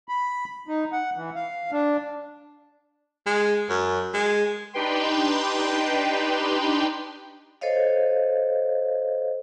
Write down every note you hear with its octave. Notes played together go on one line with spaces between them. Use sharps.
B5
D#4
F#5
E3
F5
D4
G#3
F#2
G#3
D4 D#4 G4 B4 G5 C6
A4 C5 C#5 D#5 F5